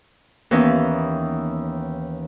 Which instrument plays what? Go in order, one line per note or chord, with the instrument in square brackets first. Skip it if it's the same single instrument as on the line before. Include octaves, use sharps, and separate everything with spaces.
[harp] D#2 E3 B3 C#4 D#4